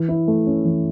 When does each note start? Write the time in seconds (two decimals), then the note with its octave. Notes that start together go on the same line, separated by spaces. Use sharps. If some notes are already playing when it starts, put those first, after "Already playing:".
Already playing: E3
0.09 E4
0.28 A3
0.46 C#4
0.65 E3